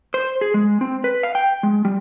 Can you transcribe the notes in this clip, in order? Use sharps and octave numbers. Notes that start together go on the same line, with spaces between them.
C5
G#4
G#3
C4
B4
F5
G5
G#3
G3